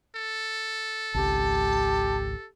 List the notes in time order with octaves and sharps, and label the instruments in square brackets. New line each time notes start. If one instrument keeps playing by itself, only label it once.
[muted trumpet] A4
[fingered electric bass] G#1 C#2 G#2 [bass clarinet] G4 [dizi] A5